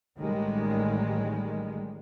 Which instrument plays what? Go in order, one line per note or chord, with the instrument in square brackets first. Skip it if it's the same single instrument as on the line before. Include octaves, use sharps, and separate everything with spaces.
[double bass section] A1 D#3 G3 G#3